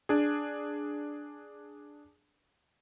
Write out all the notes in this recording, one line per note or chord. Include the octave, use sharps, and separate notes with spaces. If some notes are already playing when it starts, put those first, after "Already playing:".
D4 G#4